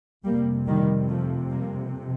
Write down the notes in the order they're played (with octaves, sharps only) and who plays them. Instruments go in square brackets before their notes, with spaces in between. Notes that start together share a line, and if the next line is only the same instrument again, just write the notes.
[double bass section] F2 C3 G3 A#3
D#3 G3
F3 A3
G3 A#3